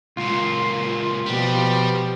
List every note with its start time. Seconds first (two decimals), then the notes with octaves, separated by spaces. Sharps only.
0.17 C#2 A#2 F4
1.26 B2 F3 G3 G4